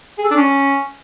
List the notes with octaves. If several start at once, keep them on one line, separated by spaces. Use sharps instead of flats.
G#4
A4
D4
C#4